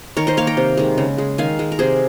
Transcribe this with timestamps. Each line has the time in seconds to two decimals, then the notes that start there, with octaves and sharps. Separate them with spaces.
0.17 D#3 A#4 C#5
0.27 C5 D#5
0.37 A#3 C#5 F5
0.47 G5 A#5
0.57 C3
0.77 D#3 G#3
0.98 C#3
1.18 G#3
1.38 D#3 F5 G#5
1.59 G#3
1.72 A#4
1.79 C3 G#4 C5